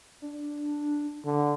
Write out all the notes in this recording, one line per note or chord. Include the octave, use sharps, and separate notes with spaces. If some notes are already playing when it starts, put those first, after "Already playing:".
D4
D3